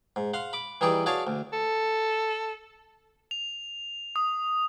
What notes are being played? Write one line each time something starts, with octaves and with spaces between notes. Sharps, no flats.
G#2
F5 F#5 C6
B5 D6
E3 G3 D#4 G#4 D5
F#4 G#4 C#5 D5 F5 A5
D2
A4
F7
D#6